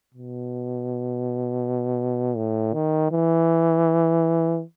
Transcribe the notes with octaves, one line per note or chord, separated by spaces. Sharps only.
B2
A2
D#3
E3